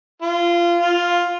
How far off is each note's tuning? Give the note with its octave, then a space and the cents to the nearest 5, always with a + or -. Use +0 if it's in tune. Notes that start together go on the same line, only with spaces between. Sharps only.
F4 -20
F4 +5